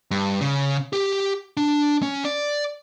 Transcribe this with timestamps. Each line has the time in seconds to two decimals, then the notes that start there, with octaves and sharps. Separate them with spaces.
0.11 G2
0.41 C#3
0.93 G4
1.57 D4
2.03 C#4
2.25 D5